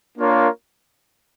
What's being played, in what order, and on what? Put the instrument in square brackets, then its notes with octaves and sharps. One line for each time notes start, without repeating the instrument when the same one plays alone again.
[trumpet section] A#3 D4 F4 A#4 C#5